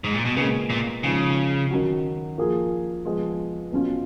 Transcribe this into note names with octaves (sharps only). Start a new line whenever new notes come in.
G#2
A#2
B2
A#2 C#3 G#3 B3
A#2
C#3 F3 G#3 D#4 G#4
D#3 F#3 C#4 F#4
F3 A#3 F4 G#4
F3 G#3 B3
B2 F#3 C#4 F4